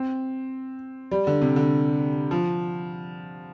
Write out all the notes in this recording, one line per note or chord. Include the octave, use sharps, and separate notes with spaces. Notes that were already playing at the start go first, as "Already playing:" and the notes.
Already playing: C4
G3
D3
C3
D3
F3